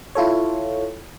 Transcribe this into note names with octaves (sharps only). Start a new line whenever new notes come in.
E4 F4 A4 C#5